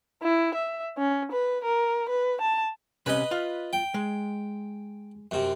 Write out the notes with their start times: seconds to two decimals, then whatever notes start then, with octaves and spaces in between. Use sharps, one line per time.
0.23 E4
0.55 E5
0.98 C#4
1.32 B4
1.64 A#4
2.09 B4
2.42 A5
3.06 C3 C#4 B4 D#5
3.31 F4 F5
3.73 G5
3.94 G#3
5.31 F#2 C3